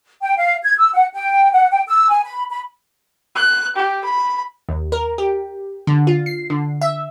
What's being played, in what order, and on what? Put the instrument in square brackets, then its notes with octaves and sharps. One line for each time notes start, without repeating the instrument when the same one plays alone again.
[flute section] G5
F5
G#6
E6
F#5
G5
F#5
G5
E6
G#5
B5
B5
[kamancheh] F#6
G4
B5
[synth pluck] D#2
A#4
G4
D3
F4
C7
D3
E5